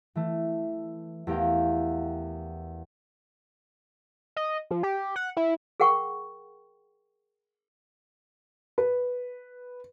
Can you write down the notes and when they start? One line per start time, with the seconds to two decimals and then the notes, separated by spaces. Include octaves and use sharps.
0.15 E3 A3
1.27 E2 A3 G4 A#4 F5 G5
4.36 D#5
4.71 F3
4.83 G4
5.16 F#5
5.37 E4
5.80 G#4 A#4 F#5 G5 C#6
8.78 B4